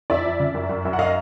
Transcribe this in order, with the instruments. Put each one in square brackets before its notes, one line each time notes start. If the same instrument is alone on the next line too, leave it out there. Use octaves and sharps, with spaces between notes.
[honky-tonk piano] F2 D5 E5
F2
C#3
F#2
F#2
F#2
F#5
D#5 F5